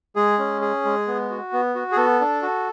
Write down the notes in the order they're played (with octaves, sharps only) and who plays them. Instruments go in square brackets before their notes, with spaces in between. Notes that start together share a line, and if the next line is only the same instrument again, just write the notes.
[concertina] G#3 G#4
C#4
G#4
G#3
B3
F#4
B3
F#4
G#4
B3 A4
D4
F#4